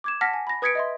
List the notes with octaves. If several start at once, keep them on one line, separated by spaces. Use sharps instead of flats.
D6 G#6 E7
F#5 A5 F6 A#6 B6
G#5
B5 A#6
B4 D#6 G#6 B6 C#7 D7
D#5 E5 C6